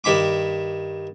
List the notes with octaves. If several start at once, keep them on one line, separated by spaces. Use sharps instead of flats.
G2 D#3 B5 D6